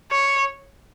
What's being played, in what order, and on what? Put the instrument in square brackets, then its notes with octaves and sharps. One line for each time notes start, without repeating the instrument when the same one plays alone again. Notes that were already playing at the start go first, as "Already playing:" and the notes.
[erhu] C#5